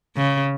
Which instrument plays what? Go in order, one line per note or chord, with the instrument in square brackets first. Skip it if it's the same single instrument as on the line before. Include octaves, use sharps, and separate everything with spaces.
[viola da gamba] C#3